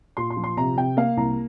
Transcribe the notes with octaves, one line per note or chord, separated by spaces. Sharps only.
A#2 C6
C6
F3
C6
C3 A#5
C3 G5
A#3 F5
C2 A#5